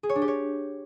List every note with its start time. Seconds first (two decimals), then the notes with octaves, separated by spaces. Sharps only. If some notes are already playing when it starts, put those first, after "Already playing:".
0.03 G#4
0.09 C#5
0.16 D4
0.22 G4
0.28 C#5